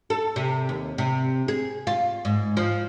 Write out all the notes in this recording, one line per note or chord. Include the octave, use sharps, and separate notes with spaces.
A4
C3
D#2
C3
G#4
F4
G#2
F3